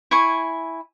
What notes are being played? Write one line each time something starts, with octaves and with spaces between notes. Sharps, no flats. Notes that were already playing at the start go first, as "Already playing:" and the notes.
E4 G#5 C#6